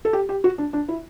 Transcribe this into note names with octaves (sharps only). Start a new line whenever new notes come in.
A4
G4
G4
F#4
D4
D4
E4